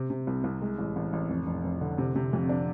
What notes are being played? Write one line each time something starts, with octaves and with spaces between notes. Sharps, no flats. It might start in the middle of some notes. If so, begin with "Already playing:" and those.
Already playing: C3
C3
C2
C2
G#3
A1
A1
A1
F1
F1
F1
D3
C3
C3
F2
D4